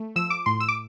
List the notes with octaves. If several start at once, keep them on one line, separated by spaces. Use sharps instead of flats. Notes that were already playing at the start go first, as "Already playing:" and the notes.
Already playing: A3
F3 E6
D6
A2 C6
E6
D6